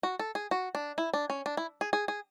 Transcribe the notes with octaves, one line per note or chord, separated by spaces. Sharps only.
F#4
A4
G#4
F#4
D4
E4
D4
C#4
D4
E4
G#4
G#4
G#4